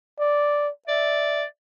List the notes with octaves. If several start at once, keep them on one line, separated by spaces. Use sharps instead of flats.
D5
D5 E5